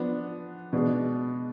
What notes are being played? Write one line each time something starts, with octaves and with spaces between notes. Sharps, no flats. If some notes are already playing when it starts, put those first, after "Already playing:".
Already playing: F3 B3 D4
B2 G#3 D4